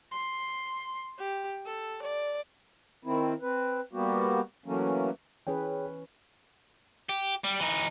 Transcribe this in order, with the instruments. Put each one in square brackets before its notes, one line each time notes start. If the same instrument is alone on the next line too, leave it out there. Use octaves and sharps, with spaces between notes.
[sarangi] C6
G4
A4
D5
[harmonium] D#3 C4 E4
C4 B4
G3 A#3 B3 F#4 G4
E3 F#3 A3 A#3 C#4
[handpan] E3 C#4 B4 [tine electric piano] G#4 C#5 G5
[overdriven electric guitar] G4
G3
E3 D#4